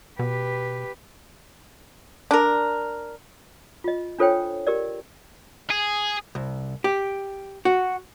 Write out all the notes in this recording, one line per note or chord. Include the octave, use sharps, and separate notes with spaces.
B2 G4 B4
D4 A#4
F4 D#5
D4 F4 A4 C5 C#5 G5
G4 A#4 D5
G#4
C2
G4
F#4